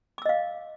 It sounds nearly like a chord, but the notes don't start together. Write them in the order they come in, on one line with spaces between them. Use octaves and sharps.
D6 E6 D#5 F5